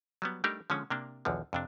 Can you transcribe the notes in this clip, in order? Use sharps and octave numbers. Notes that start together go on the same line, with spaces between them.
F#3 G3 B3
G3 A3 D4 D#4 G4 A#4
D3 F3 G#3 C#4
C3 A#3 D4
B1 E2 D3 F3
F2 C3 D4